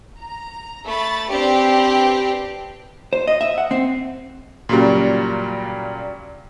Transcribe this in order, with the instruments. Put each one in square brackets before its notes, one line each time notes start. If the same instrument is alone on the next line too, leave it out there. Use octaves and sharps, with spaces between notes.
[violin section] A#5
A3 B5 A6
C4 D4 G4 B4
[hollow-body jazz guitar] C5
D#5
E5
F#5
C4
[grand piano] A#2 C#3 F#3 G3